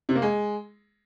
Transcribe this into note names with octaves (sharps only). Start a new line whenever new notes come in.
C3
A#3
G#3